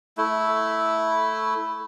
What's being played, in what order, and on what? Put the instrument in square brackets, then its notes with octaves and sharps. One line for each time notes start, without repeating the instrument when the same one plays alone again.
[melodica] A3 E4